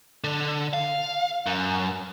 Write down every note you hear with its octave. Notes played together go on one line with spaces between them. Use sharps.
D3
F5
F#2